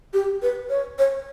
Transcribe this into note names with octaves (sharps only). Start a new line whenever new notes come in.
G4
B4
C#5
C#5